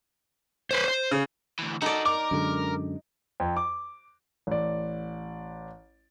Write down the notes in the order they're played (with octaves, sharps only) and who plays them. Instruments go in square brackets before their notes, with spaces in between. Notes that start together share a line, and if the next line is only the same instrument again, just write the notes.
[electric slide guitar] B4 C5
C5
[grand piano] C#3
[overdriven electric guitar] D2 E3
[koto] D#4 D5 [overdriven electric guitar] F#4 A4
[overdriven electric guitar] A#4 [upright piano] D6
[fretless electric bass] F#2 D3 G#3
[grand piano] F2
D6
A1 D5